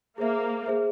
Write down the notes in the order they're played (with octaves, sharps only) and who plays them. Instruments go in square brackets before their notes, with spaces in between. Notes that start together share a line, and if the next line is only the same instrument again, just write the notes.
[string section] A#3 [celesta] G#4 C5 E5
[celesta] G#4 C5 E5